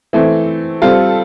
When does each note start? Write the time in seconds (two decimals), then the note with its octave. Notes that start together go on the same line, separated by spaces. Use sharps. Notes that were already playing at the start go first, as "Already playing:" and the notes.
0.13 E3 A3 C4
0.82 G3 C4 F4 A4